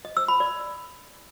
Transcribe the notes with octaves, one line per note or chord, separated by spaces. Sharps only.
D#5
E6
B5
D5